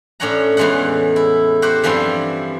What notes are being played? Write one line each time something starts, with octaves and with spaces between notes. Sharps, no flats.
A2 C#4 D4 C#5 F#5 A#5
E2 A2 E3 G#3 F#5
E4
F#4 G4 C5 F#5
G2 E3 F3 C4 E4